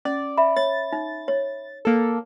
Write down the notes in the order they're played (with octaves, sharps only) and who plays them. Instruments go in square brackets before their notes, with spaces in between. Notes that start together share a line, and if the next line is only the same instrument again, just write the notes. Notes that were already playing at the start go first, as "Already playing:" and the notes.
[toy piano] C#4 [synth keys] D5
[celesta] E5 B5
[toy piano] C#5 [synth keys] A6
[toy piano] D#4
C#5
[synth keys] A#3 A4